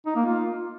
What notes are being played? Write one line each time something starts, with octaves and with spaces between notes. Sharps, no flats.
D#4
A#3
F4